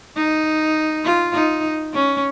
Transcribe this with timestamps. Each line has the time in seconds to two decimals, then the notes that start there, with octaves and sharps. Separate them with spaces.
0.16 D#4
1.04 F4
1.34 D#4
1.94 C#4